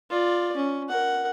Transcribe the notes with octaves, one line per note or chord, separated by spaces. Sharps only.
F4 D5
C#4
A#4 F#5